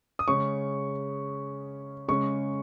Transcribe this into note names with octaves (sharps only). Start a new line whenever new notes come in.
D#6
C#3 G#3 C#4 C#6
C#3 G#3 C#4 C#6